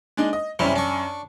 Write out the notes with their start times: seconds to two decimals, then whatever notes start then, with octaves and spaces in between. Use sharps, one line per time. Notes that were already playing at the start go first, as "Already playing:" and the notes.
0.17 G#3 D4 D#4
0.33 D#5
0.59 F#2 C3 G3 C#4 E4
0.76 D4 C#6